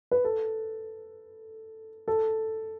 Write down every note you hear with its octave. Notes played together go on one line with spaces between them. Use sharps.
B4
A4
A4